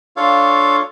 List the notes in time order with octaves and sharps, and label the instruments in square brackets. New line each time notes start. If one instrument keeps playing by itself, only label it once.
[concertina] D4 F4 A4 C#5 F5